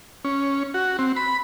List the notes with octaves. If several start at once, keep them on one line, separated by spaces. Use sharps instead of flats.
C#4
F#4
C4
B5